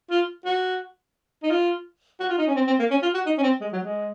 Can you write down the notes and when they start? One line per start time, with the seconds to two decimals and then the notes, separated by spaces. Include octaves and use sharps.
0.10 F4
0.45 F#4
1.43 D#4
1.50 F4
2.20 F#4
2.29 F4
2.38 D#4
2.47 C#4
2.55 C4
2.67 C4
2.79 A#3
2.91 C#4
3.02 F4
3.14 F#4
3.26 D#4
3.38 C#4
3.43 C4
3.61 G#3
3.72 F#3
3.84 G#3